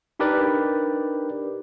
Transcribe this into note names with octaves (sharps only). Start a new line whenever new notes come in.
D4 D#4 G4 A#4 B4 D5